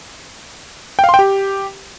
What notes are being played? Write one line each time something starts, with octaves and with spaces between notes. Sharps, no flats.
G5
F5
C6
G5
G4